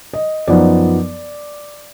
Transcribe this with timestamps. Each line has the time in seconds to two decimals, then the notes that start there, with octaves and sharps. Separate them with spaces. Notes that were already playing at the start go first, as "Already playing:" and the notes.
0.13 D#5
0.48 F#2 F3 B3 D#4 D5